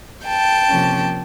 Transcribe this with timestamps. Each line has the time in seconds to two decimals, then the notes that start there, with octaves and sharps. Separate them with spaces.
0.27 G5 A5
0.68 C3 F3 A#3 C#4